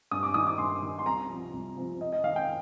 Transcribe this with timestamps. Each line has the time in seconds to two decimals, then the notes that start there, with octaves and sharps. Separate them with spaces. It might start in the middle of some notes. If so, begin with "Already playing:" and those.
0.11 G2 D#6
0.23 D6
0.34 D#3 D#6
0.47 D6
0.58 G2 C6
0.82 D#3
0.99 C6
1.06 C2 A#5
1.29 C3 F3
1.53 C2
1.77 C3 F3
2.00 F2 D#5
2.13 D#5
2.23 D#3 F5
2.36 G5